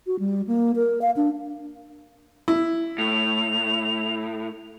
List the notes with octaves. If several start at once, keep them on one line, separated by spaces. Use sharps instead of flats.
F#4
G3
A#3
A#4
F5
D4
E4
A2 F7